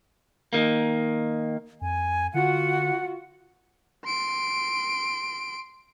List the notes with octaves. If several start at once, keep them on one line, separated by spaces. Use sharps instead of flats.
D#3 A#3
F2 G#5
D3 F4 F#4 F#5
C6 D7